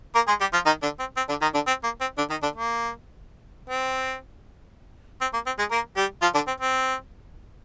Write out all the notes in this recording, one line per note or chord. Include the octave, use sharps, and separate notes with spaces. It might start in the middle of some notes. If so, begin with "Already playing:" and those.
A#3 A#4
G#3 G#4
G3 G4
F3 F4
D#3 D#4
D3 D4
C4
C4
D3 D4
D#3 D#4
D3 D4
C4
A#3
C4
D3 D4
D#3 D#4
D3 D4
A#3
C4
C4
A#3
C4
G#3 G#4
A#3 A#4
G3 G4
F3 F4
D3 D4
C4
C4